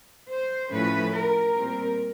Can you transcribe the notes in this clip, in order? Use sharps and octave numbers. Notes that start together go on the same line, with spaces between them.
C5
A2 F3 A3 C#4 B4
A#4
A#2 G3 C4